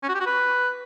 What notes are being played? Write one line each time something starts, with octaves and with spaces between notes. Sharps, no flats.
C#4
F#4
G4
F#4
B4